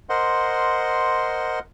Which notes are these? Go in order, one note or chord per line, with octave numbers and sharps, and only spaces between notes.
A#4 C5 D#5 F#5 C6